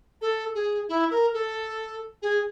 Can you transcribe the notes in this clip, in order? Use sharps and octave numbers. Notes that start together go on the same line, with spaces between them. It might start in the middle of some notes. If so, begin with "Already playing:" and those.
A4
G#4
E4
A#4
A4
G#4